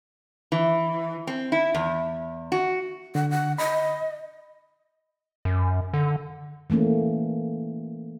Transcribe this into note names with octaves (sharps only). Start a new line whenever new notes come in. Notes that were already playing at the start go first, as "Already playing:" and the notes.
E3
C4
E4
E2
F#4
D3 F#5
F#5
D#5 B5
F#2
D3
E3 A3 A#3 C#4